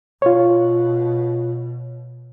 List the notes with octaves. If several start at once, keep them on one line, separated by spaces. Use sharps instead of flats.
B2 F4 C#5